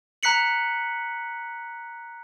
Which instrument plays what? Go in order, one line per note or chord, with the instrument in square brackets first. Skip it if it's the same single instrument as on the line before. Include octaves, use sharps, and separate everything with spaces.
[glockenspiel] A#5 F#6 B6 C#7 F#7